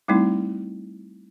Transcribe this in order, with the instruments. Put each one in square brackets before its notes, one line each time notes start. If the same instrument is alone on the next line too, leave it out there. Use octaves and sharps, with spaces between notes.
[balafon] G3 A3 C4 D#4 E4